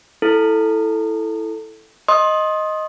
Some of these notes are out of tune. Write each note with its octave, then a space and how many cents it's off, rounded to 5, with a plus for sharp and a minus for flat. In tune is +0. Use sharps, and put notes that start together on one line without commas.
E4 +0 A4 +0
D#5 +0 C6 +30 D#6 +5